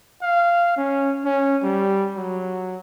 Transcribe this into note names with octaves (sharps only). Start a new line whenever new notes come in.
F5
C#4
C#4
G3
F#3